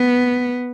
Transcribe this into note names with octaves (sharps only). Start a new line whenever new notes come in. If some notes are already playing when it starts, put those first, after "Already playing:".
Already playing: B3